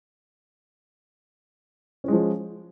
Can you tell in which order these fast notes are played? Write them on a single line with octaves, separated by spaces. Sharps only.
C#4 G#3 F3